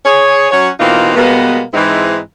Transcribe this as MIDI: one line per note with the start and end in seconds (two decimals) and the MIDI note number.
0.04 0.46 68
0.04 0.46 73
0.51 0.69 54
0.51 0.69 61
0.51 0.69 66
0.51 0.69 73
0.79 1.12 47
0.79 1.12 52
0.79 1.12 58
0.79 1.12 60
0.79 1.12 63
0.79 1.12 65
1.16 1.61 47
1.16 1.61 55
1.16 1.61 56
1.16 1.61 58
1.16 1.61 59
1.74 2.17 44
1.74 2.17 52
1.74 2.17 56
1.74 2.17 60
1.74 2.17 63
1.74 2.17 64